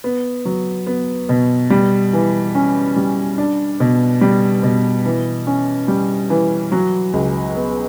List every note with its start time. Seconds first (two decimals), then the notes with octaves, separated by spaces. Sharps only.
0.04 B3
0.45 F#3
0.87 B3
1.29 B2
1.70 G3
2.13 E3
2.55 C#4
2.96 G3
3.38 D4
3.80 B2
4.21 G3
4.63 B2
5.05 E3
5.47 C#4
5.88 G3
6.30 E3
6.72 F#3
7.13 C#2
7.55 B3